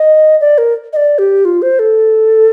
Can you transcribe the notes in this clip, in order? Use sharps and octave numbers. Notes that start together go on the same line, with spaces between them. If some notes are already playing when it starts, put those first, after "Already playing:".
Already playing: D#5
D5
A#4
D#5
D5
G4
F4
C5
A4